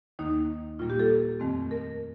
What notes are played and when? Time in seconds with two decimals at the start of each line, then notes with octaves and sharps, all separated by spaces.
0.19 D#2 D#3 A#3 D#4
0.79 A#2 G3 A#3 F4
0.90 G4
1.00 A4
1.40 F2 D#3 A3 C4
1.71 A#4